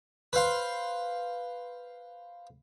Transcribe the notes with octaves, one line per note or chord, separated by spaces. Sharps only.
B4 C5 F5 C6